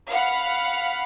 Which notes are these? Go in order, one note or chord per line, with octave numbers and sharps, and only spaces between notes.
F5 F#5 B5